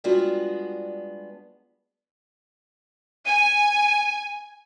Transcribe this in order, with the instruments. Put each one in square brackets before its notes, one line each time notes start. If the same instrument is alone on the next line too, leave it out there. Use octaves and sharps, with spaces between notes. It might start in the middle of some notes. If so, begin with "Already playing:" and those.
[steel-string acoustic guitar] G3 G#3 B3 D4 F4 F#4
[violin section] G#5 [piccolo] D#7